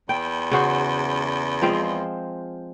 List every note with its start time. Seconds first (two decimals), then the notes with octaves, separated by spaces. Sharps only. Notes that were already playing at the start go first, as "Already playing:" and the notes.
0.09 E2 G5
0.51 C#3 F#4 C5
1.62 F3 G#3 C4